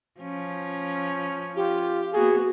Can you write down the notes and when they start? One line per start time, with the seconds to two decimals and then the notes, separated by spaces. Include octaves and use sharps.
0.20 F3 C#4
1.56 F4 G4
2.13 A#3 B3 F#4 G#4